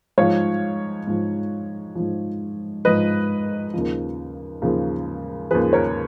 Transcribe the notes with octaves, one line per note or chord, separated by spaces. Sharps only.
G#2 F3 C#5 F5
G#2 F3
G#2 F3
G#2 F3 B4 D#5
D#2 C#3 F3
D#2 C#3 F3
D#2 C#3 F3 G#4 B4
A#4 C#5